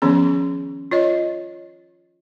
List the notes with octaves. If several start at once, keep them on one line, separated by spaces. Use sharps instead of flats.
D#3 F3 B3 C#4 G#4
F4 C#5 D#5